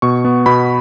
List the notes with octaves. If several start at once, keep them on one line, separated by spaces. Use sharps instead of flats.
B2 C#6
B3
B2 B5